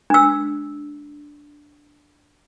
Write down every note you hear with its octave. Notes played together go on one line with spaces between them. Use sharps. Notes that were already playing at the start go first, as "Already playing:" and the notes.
D4 E6